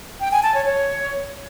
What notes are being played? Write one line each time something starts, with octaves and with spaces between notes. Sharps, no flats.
G5
G#5
A5
C#5
C#5